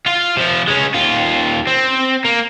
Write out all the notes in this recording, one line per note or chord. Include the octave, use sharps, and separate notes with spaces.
F4 F5
C3 F3
G#3 C#4
D#2 F4
C4
A#3